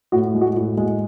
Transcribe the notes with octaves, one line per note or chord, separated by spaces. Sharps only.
A2 F#4
G#3
F#4
A2 F#4
G#3